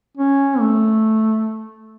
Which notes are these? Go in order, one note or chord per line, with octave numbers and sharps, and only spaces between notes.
C#4
A3